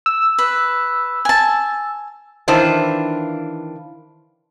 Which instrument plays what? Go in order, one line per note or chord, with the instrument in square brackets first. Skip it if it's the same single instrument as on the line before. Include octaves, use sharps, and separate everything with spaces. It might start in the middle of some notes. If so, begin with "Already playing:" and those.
[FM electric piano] E6
[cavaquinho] B4
G#5 A5
[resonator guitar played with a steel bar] D#3 E3 D4 F4 C5